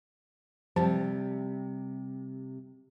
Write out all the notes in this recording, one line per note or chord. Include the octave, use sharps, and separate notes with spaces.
C3 F3 G3 A5